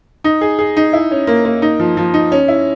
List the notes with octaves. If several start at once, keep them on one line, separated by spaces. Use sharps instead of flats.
D#4
G#4
G#4
D#4
E4
C#4
A#3
A#3
D#4
F3
F3
D#4
C#4
E4